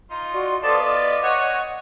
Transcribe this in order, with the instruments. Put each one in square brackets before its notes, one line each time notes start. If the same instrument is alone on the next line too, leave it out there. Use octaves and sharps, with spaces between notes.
[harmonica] D#4 F4
[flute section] F#4 D5 C6
[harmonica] B3 F4 F5 [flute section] A4 C5 D#6 [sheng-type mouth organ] D5 A5
[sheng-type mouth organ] D5 [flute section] D#5
[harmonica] C#5 C#6 D#6 [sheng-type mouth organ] F#5